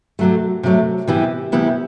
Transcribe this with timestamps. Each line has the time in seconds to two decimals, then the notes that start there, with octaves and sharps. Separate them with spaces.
0.19 C3 F#3 A3
0.63 C3 F#3 A3
1.07 C3 E3 B3 E4 G4
1.52 C3 E3 B3 E4 G4